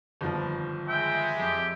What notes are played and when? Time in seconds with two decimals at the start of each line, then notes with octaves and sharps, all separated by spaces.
0.21 G1 D#2 F3
0.88 G#3 E5 G5
1.38 F2 G4